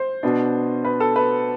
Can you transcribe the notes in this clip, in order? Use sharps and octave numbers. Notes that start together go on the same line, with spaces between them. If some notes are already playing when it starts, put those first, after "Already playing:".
Already playing: C5
B2 B3 D4
B4
A4
B4